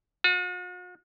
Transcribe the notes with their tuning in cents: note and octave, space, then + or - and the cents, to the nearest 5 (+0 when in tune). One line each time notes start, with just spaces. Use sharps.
F#4 -45